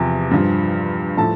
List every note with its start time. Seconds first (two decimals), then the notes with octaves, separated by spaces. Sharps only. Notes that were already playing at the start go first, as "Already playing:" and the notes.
Already playing: E2 C3 F3
0.31 G2 F3
1.17 A2 F3 A4 A5